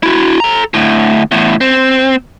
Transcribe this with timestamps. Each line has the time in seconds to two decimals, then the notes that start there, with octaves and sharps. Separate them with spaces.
0.03 E4 F#4
0.40 A4 A#5
0.74 D2 A2
1.32 E2 A2
1.61 C4